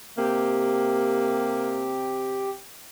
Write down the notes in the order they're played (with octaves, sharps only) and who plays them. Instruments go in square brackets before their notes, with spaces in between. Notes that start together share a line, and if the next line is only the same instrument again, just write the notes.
[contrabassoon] C3 [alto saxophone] A#3 [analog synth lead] G4